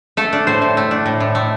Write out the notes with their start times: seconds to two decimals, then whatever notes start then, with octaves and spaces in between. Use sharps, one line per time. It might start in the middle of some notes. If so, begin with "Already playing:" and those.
0.17 A3 A4
0.33 D4
0.47 A2 C5
0.62 A2
0.77 A3
0.91 D4
1.06 A2
1.20 A2
1.35 A3